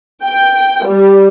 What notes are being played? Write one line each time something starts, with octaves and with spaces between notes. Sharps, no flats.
G5
G3